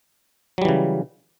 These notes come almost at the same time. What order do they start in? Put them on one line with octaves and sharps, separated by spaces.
F#3 G3 E3 C#3